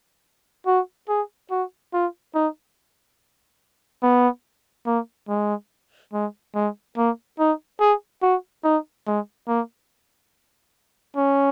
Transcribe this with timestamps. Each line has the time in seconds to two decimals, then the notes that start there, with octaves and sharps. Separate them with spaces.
0.67 F#4
1.08 G#4
1.50 F#4
1.93 F4
2.35 D#4
4.03 B3
4.86 A#3
5.29 G#3
6.13 G#3
6.55 G#3
6.97 A#3
7.39 D#4
7.80 G#4
8.22 F#4
8.64 D#4
9.07 G#3
9.48 A#3
11.16 C#4